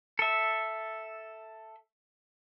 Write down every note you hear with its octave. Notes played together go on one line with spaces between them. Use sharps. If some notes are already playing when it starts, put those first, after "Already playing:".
A4 E5